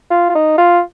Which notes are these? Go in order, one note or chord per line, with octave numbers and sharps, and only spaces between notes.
F4
F4
D#4
F4